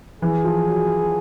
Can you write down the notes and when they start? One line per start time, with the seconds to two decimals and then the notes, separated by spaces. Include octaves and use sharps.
0.22 E3 G#4
0.44 F3
0.68 F#3